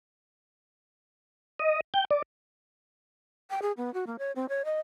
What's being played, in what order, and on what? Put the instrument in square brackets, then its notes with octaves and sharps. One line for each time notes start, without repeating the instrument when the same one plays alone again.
[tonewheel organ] D#5
G5
D5
[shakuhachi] G5
G#4
B3
F#4
A#3
C#5
C4
C#5
D#5